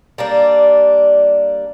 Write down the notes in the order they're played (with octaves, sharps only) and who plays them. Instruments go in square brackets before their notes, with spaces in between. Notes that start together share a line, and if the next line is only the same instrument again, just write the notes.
[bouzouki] G3 A#3 D4